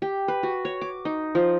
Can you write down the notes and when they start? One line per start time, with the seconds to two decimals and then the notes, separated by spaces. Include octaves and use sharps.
0.02 G4
0.28 B4
0.43 F#4
0.65 C#5
0.81 D6
1.05 D#4
1.35 F3